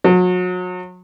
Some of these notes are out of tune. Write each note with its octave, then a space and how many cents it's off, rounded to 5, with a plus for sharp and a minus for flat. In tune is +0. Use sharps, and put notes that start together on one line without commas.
F#3 -35